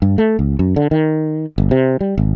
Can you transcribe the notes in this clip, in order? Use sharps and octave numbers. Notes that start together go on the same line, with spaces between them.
G2
A3
C#2
F#2
D3
D#3
G1
C3
G3
G#1